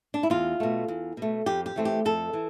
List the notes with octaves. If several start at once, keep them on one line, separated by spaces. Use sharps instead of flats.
D4
E4
E2 F4
B2 A3
E2
B2 A3
F2 G4
G4
E3 A3 C4
G4
F2 A4
E3